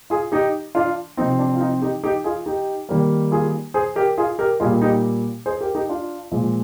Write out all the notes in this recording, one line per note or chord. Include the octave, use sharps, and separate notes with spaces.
F4 G#4
D#4 G4
D4 F4
C3 F3 C4 D#4
D4
F4
D#4
D#4 G4
D#4 G4
F4 G#4
D#4 G4
D#3 G3 A#3
F4 G#4
G#4 C5
G4 A#4
F4 G#4
G4 A#4
A#2 G3 A#3 F4 G#4
D#4 G4
G#4 C5
G4 A#4
D#4 G4
D4 F4
A#2 F3 G#3